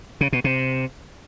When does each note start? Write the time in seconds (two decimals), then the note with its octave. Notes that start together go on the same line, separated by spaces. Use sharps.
0.21 C#3
0.33 B2
0.44 C3